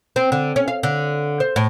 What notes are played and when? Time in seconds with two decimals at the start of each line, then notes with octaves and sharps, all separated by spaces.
0.16 C4
0.32 D3
0.56 C#4
0.68 F5
0.83 D3
1.40 C5
1.56 A2